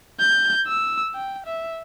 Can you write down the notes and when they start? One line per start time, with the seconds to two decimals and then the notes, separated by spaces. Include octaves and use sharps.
0.20 G6
0.67 E6
1.14 G5
1.46 E5